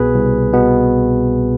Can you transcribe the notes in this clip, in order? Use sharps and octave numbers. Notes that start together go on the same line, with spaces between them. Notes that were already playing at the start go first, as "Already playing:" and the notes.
Already playing: C2 B2 B3 G#4 B4
C2
B2 B3